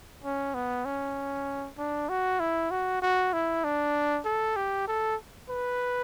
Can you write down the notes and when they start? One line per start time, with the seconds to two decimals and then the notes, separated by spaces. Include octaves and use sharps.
0.24 C#4
0.54 B3
0.86 C#4
1.78 D4
2.09 F#4
2.40 E4
2.71 F#4
3.02 F#4
3.33 E4
3.64 D4
4.25 A4
4.56 G4
4.88 A4
5.50 B4